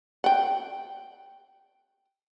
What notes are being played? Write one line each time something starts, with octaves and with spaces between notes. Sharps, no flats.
F#5 G5